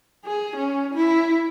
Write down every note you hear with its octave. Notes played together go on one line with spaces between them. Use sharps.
G#4
C#4
E4